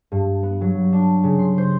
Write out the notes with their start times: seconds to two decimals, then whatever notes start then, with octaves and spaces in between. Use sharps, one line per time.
0.12 G2
0.43 B3
0.61 F#3
0.93 D4
1.24 C#3
1.39 C6
1.58 C5